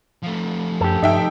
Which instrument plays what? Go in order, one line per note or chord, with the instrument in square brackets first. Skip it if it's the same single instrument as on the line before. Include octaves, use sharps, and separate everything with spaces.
[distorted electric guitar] F3 A3
[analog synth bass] F#2 [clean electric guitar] G4 A4
[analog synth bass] G2 [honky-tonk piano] D#4 E5 G5